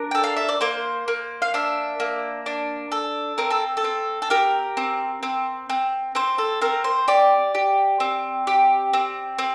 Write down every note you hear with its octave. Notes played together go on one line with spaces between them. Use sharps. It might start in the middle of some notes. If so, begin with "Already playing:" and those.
Already playing: D4 A#4
A4 G5
F5
E5
D5
A#3 C5
A#3
F5
D4 E5
A#3
D4
A4
C4 A#4
A4
A4
C4
A4
G4 A#4
C4
C4
C4
C4 C5
A4
C4 A#4
C5
G4 D5
G4
C4
G4
C4
C4